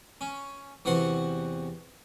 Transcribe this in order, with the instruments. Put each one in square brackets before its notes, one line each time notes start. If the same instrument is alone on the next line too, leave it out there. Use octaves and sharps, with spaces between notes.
[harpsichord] C#4
E2 C3 F#4 F#5 C6